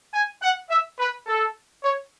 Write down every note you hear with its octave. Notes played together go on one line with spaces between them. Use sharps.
G#5
F#5
E5
B4
A4
C#5